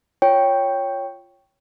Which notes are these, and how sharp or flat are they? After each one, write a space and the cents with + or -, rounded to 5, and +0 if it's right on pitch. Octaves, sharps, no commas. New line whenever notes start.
F4 +0 C#5 +0 G5 +0